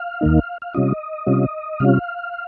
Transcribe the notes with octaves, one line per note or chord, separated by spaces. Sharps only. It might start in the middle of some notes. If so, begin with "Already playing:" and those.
Already playing: F5
D#2 D#3 A#3 D#4
F5
C3 G3 C#4 F4 D#5
C3 G3 C#4 F4
C3 G3 C#4 F4 F5